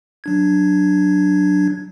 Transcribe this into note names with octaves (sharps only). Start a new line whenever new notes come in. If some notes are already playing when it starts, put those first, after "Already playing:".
F#3 D4 G#6